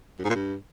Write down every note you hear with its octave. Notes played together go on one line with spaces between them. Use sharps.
F#2
G#2
A#2
G2